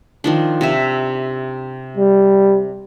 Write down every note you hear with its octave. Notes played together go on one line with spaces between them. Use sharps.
D#3 F3 D4
C3 E5
G3